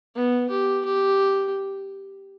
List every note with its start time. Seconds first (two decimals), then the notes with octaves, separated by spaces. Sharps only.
0.15 B3
0.50 G4
0.85 G4